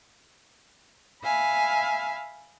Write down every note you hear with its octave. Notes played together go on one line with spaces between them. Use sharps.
E5 F5 G#5 B5